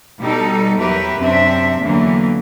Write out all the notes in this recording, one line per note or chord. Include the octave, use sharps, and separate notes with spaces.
B2 G3 D#4 A4
E2 F#3 G4 A#4 B4 E5
F#2 C3 C4 D4 E5
E2 D3 E3 F#3 A#3